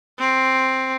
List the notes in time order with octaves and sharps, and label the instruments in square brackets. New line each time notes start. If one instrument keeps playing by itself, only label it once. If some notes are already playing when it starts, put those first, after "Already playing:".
[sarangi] C4